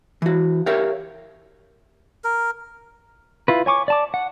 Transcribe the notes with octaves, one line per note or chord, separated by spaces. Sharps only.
E3 F#4
G4 A#4 C#5 E5 F5
A#4
E4 F4 B4
C#5 G#5 C#6 D6
D5 A5 D6
F#5